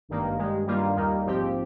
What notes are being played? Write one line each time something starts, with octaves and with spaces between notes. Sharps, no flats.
G#1 G2 D#3 A#3
G2 D#3 G#3
G2 D#3 G3 A#3 F4
D#2 D#3 G3 A#3 D#4
A#1 G#2 F3 C4 G4